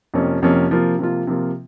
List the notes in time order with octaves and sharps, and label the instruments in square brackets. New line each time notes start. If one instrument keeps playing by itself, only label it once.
[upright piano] F2 C3 F3 A#3 C#4
F2 C3 F3 A#3 C#4
C3 F3 A#3 F4
C3 F3 A#3 F4
C3 F3 A#3 F4